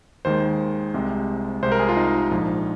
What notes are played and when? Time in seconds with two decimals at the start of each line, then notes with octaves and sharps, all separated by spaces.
0.25 D#2 D#3 G#3 C5
0.94 C2 C3 G#3
1.62 C2 C3 G#3 C5
1.72 A#4
1.80 G#4
1.89 F4
1.97 D#4
2.31 A#1 G#2 F3